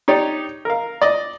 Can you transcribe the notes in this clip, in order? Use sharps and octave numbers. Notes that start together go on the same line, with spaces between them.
D#4 G4 C#5 D5
A#4 F5
D5 D#5